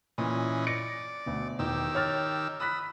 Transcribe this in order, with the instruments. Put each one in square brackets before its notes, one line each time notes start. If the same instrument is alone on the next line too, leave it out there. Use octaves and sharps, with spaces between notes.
[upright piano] A#2 [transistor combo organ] E3 C#4 D#5
[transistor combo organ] D5 [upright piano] A#6 C#7 D7
[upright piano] D2 B2
[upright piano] E1 D6 [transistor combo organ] D#3 G4 E6
[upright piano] C#5 F6 A6
[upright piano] B5 F#6 B6 [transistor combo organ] D#6 E6